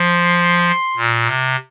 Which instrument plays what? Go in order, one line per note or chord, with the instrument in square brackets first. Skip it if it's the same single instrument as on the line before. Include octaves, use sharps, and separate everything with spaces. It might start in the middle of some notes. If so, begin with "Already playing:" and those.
Already playing: [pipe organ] F3 [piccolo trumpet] C6
[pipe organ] A#2
C3